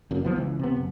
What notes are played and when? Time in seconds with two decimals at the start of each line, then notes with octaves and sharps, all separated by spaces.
0.11 F#1 F#2
0.24 D#3 F3 B3
0.36 C#2 E3
0.59 C3 B3
0.76 F#1